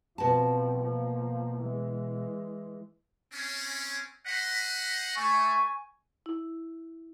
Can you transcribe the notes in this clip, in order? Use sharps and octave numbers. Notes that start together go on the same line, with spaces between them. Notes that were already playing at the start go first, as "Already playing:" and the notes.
B2 F3 C4 A5
F3 A#3
E3 G#3
C4 C#4
C5 D#5 F#5 B6
A3 G#5 C#6
E4